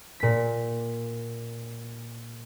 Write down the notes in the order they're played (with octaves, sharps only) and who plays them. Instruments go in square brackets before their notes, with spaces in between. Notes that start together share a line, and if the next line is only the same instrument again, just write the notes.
[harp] A#2 B6